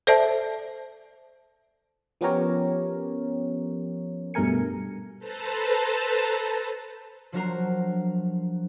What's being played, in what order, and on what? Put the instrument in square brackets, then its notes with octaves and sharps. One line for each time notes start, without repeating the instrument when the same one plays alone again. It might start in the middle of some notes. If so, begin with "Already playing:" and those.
[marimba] A4 C5 D5 E5 A5
[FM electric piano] F3 B3 C#4 G4 A#4 C#5
G2 B2 A3 A#4 G#5 C#7
[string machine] A4 B4 C5 A5 A#5
[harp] F3 F#3 D4 F#4 A#4 C5